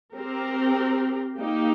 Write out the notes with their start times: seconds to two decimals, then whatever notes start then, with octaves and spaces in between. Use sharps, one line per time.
0.15 C4 G4 A#4
1.38 A#3 D#4 G4